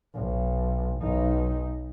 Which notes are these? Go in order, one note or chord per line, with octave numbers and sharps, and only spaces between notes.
B1
B1 D#4